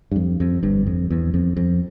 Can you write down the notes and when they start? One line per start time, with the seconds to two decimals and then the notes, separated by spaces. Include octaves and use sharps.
0.12 G2
0.16 F2
0.40 F2
0.63 G1 G2
0.86 F2
1.10 E2
1.34 F2
1.57 F2